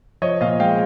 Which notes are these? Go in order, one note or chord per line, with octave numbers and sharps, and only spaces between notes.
F3 C#5 D#5
A#2 D#5 F5
G#3 F5 G5